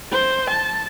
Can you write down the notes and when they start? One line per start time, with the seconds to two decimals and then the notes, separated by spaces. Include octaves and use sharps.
0.13 C5
0.50 A5